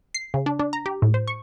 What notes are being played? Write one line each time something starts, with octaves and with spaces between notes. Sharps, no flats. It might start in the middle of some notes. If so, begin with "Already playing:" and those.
C7
C#3
D4
D4
A#5
G4
A2
C5
C#6